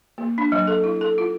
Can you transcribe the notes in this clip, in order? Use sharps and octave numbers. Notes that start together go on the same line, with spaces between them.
A#3
D4
F#3
A4
E4
A4
F4